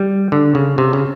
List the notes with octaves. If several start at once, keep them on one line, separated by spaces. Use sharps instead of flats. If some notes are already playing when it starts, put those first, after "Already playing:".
Already playing: G3
D3
C#3
C3
C#3